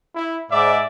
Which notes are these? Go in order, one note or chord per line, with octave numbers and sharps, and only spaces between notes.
E4
G#2 D5 E5